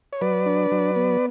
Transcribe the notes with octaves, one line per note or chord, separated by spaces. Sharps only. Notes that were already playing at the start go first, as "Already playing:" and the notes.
C#5
F#3 B4 D5
D4
F#3
B3